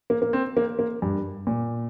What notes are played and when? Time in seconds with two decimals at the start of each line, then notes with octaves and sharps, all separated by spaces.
0.10 A#3
0.22 A#3
0.33 C4
0.57 A#3
0.79 A#3
1.02 G2
1.47 A#2